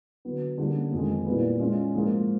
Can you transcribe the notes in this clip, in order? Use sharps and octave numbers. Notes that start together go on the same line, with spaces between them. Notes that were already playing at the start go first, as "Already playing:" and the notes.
D3 F#3 B3
D3 G3 A#3 C#4
F2 C3 D#3 G#3
A#2 G3 B3 E4
G#3 C#4 F4
G#2 F3 A#3